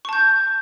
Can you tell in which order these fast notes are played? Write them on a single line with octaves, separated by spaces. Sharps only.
C#6 A5 G6